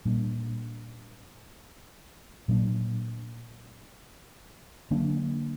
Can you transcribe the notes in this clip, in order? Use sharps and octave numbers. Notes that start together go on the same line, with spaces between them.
A#2 G3 A#3 D4
A#2 F#3 A#3 D4
D3 F#3 A#3 D4